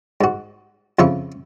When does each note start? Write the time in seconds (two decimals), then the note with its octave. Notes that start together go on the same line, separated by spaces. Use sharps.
0.21 G#2 F#4
0.99 F2 C#3 F3 E4 F4 C#6